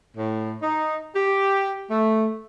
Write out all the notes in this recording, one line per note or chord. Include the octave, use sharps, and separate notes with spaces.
A2
D#4
G4
A3